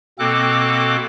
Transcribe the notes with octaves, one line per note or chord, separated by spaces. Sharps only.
B2 A#3 C4 A4 D6 F#6